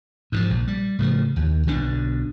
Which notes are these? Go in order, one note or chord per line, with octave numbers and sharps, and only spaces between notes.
G#2 E3 F3
A#1
G3
A2 C#3 F3
D#2
B1 B2 D3 D4